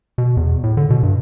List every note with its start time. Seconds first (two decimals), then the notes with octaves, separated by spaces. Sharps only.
0.18 B2
0.37 E2
0.64 A2
0.77 D3
0.90 B2
1.03 G2